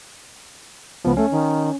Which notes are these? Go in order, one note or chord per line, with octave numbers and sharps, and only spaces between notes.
C#2 F3 B3
A3 C#4
D#3